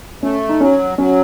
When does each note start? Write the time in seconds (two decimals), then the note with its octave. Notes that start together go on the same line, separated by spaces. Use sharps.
0.23 A3 C#4
0.49 D#4
0.60 F#3 C#4
0.98 F#3 C#4